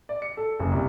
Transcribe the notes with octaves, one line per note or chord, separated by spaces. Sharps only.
D5
C#7
A4
F#1
C2